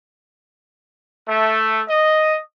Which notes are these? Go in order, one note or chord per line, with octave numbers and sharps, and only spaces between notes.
A3
D#5